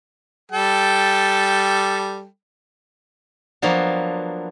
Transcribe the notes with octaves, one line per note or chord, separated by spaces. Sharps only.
G3 A4 G5
F3 F#3 A#3 B3 D4